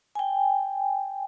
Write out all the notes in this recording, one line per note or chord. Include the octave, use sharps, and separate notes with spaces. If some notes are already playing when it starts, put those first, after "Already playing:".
G5 G#5